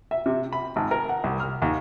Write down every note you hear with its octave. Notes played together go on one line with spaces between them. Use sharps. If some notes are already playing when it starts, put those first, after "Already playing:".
E5
C3
B5
G#1
A#4
F#5
C2
F6
D#2